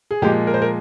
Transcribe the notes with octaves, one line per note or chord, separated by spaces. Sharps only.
G#4
A#2 F3 G#3 G4
A#4
C5
A#4